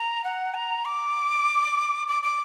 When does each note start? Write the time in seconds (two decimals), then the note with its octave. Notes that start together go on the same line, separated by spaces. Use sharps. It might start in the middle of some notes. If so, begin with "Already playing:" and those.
Already playing: A#5
0.24 F#5
0.54 A#5
0.85 D6
2.08 D6
2.23 D6